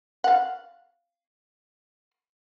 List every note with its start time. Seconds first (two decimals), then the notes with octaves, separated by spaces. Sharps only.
0.24 F5 F#5